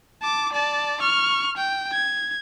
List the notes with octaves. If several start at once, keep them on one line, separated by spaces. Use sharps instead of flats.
A5 D6
D5 A5
C#6 F6
G5
G#6